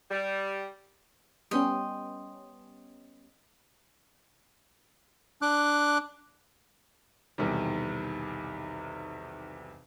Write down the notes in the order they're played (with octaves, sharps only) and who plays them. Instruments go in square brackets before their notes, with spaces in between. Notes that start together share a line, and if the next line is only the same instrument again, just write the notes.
[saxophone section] G3
[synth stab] G3 B3 C#4 [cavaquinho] D#5 G5 C6
[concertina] D4 D6 F#6
[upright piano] B1 E2 C3 D#3 G3